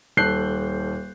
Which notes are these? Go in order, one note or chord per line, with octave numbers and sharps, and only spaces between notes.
D#1 A4 F#6 G6 C7